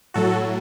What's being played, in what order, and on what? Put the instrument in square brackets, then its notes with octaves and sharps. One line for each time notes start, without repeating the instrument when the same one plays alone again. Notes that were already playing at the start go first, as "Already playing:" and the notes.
[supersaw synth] A2 F#3 F#4 A4